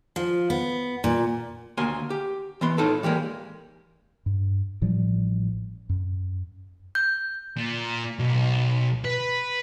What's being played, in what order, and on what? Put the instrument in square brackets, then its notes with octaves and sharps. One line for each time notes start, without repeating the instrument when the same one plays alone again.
[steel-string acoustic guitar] F3
B3
A#2
[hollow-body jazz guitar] D2 A#3 G#5 C6
G4
E3 B3 C6
A2 D#4 F4 A4 A5
E3 G3 G#3 A#3
[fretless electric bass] G2
A1 A2 F3 G3
F#2
[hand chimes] G6
[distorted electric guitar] A#2
B1
B4